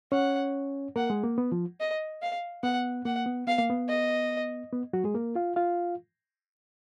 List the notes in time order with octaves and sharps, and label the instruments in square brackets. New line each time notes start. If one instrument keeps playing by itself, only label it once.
[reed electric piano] C#4 C#5 [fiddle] F#5
[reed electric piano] A#3 A#4 [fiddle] F#5
[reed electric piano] G#3 G#4
A#3
B3
F3 F4
[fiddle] D#5
F5
[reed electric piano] B3 [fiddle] F#5
[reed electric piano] A#3 [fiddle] F#5
[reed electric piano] B3
[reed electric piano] B3 [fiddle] F5
[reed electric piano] A#3
B3
[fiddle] D#5
[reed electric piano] B3
F#3 F#4
G#3 G#4
A#3 A#4
F4 F5
F4 F5